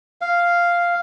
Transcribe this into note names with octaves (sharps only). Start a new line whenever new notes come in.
F5